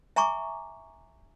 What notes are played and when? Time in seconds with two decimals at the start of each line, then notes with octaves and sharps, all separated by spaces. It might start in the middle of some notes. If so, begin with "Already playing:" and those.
0.16 E5 G#5 A#5 C#6 D6